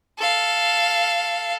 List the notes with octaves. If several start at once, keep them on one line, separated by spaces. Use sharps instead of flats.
A4 F5